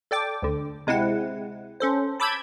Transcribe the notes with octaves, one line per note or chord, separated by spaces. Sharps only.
A4 D5 G5 D6
D2 D3
C3 G#3 C4 E4 F#5
C#4 A4 C5
A5 B5 D6 E6 G6 G#6